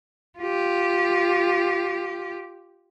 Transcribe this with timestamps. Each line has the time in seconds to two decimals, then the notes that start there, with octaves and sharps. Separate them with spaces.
0.39 F4 G4